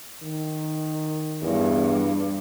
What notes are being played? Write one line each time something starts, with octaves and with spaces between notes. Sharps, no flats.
D#3
E2 G2